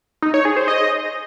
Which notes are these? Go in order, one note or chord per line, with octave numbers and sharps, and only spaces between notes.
D#4
C#5
G#4
C5
D#5